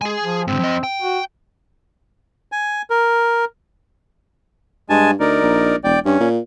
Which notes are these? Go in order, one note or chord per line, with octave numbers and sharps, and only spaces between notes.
G#3 G#4 G#5
F3
G#2 D3 C4
F2 D#5
G5
F#4
G#5
A#4
G2 G#3 G#5 A5
D2 D#4 A#4 D5
A#1
E1 D5 G5
G2 C#4
A#2